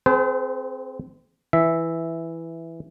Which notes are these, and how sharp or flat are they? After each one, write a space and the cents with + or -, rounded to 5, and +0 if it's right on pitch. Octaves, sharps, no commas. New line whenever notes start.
C4 +0 G#4 +35 C5 -45
E3 +0 E5 +0